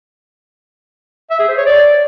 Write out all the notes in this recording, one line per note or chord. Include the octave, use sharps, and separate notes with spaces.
E5
G#4
C5
C#5
D5